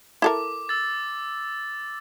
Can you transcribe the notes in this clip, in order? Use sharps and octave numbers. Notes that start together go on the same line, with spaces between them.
E4 A4 A#4 D6
E6 A6